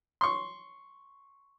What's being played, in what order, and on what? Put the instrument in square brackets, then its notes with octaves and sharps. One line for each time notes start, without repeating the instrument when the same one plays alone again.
[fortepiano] C6 C#6